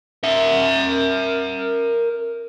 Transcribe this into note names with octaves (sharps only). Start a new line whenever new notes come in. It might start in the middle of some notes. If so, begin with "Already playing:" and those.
A#4 E5